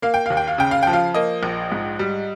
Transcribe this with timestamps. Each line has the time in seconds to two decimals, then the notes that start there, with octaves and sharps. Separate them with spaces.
0.02 A#3 F5
0.14 G5
0.26 D#2 F5
0.37 G5
0.47 F5
0.58 C#3 G5
0.71 F5
0.83 F3 G5
0.93 F4 F5
1.14 A#3 D#5
1.43 A#1
1.72 G#2
1.99 G3